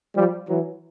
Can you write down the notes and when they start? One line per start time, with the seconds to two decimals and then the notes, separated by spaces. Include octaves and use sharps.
0.16 F3 G3
0.49 E3 F#3